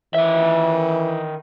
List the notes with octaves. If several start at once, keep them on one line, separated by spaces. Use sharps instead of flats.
D#3 E3 E5